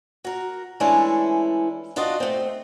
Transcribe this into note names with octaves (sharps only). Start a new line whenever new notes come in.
F#4 A#4
E3 G#3 A3 C#4 D4 E4
D4 F4 F#4 D5 D#5
A3 C4